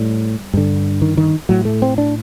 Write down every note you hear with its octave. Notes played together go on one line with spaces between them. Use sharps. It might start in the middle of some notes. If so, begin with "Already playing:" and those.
Already playing: A2 G3
G2 D3
D#3
D#3
A2 F#3
A3
C4
D4